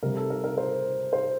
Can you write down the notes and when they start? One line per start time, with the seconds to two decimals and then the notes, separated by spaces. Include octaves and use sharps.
0.03 C3 G3 A#4
0.16 A4
0.30 A#4
0.44 A#4
0.58 C5
1.13 C5